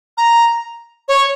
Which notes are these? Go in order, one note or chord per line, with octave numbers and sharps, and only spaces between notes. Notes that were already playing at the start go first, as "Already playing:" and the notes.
A#5
C#5